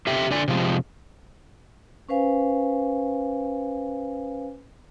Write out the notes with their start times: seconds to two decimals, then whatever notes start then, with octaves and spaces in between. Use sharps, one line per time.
0.07 G4 A4 E5 G5
0.31 D3 D5 G#5
0.48 C3 F3 G#3
2.09 C#4 B4 C5 F5 G#5